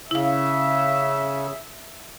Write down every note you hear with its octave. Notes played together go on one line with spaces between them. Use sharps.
C#3 E4 E5 F5